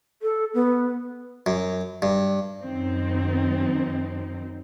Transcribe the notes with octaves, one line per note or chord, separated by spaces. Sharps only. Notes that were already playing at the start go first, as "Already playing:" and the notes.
A4
B3
F#2
G2
F#2 D#3 F#3 C4 D#4